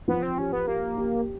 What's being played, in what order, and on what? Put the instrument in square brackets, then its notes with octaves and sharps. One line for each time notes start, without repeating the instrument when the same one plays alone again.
[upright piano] F3 [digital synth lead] B3
[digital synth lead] C4
[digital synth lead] C#4 [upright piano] G4
[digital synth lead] B3
[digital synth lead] A#3 [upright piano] G4
[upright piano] G4